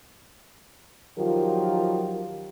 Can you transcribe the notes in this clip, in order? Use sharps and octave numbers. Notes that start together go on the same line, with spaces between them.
D#3 F3 F#3 F4 G4 A#4